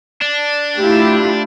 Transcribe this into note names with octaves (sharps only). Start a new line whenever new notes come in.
D4
A3 E4 F4 G4